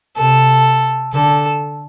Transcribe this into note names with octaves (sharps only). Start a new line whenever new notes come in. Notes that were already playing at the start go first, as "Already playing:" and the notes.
C3 A4
D3 A4